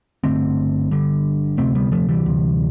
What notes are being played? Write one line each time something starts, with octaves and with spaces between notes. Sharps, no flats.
G1 G2 D3 A3 C4
G1 G2 D3
D2 C3 A3 C4
G3 B3
F3 A3
E3 G3
D2 C3